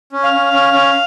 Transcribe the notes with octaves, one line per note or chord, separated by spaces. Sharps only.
C#4
F5
C#4
C#4
C#4